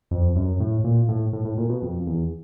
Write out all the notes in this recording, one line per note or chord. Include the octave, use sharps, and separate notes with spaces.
F2
F#2
A2
A#2
A2
A2
A2
A#2
B2
F2
E2